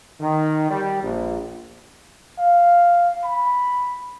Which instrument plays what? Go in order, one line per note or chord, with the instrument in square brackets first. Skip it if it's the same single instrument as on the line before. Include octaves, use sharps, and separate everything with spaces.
[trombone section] D#3
G3
A#1
[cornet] F5
B5